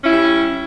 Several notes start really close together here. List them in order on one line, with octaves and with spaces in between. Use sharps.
C#4 E4 G3